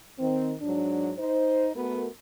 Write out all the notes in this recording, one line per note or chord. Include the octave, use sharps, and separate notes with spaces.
D#3 C4
G#2 F#3 D4
D#4 C5
A3 B3 F#4 A#4